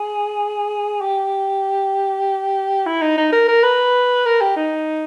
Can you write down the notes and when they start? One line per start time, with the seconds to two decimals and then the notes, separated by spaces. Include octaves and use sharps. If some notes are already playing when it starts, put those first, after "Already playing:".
Already playing: G#4
1.01 G4
2.86 E4
3.02 D#4
3.17 D#4
3.32 A#4
3.48 A#4
3.63 B4
4.26 A#4
4.41 G4
4.56 D#4